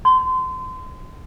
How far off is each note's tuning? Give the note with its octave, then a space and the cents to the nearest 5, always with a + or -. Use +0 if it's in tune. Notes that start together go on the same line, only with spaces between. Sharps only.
C6 -30